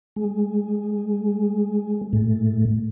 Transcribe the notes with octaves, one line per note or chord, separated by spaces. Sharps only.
G#3
A2